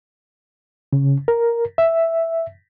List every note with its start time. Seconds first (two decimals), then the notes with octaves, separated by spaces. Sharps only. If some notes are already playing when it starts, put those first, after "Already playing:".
0.93 C#3
1.28 A#4
1.78 E5